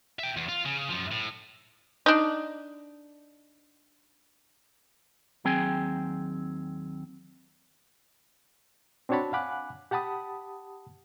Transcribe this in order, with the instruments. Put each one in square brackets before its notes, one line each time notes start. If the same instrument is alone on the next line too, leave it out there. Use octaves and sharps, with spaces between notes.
[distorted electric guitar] E5 G5
E2
F4
C#3
F#2 F3
A2
[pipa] D4 D#4
[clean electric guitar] D#2 F#3 C4 G#4 G5 G#5
[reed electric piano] C4 D4 F#4 C#5 A5 B5
F5 F#5 G#5 B5 D6 F#6
G4 F#5 A5 B5 D#6